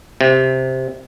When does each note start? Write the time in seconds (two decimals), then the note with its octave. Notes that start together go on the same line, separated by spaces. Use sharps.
0.21 C3